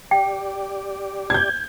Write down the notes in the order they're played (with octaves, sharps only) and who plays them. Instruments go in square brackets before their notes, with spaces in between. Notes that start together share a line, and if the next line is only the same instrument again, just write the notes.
[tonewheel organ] G4 D5 [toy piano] G5
[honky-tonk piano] G6 G#6